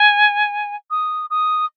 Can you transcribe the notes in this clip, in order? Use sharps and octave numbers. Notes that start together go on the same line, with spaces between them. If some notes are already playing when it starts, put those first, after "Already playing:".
Already playing: G#5
D#6
D#6